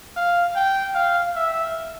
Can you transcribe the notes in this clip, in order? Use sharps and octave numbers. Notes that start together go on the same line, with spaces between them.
F5
G5
F5
E5